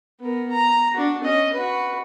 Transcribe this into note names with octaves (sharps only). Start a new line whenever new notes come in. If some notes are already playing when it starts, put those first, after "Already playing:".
B3 A#4
A#5
D4 F#4
C#4 D#5
F#4 B4